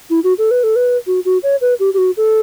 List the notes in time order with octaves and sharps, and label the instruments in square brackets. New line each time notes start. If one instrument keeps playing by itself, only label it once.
[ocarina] E4
F#4
A4
B4
A4
B4
F#4
F#4
C#5
B4
G4
G4
F#4
A4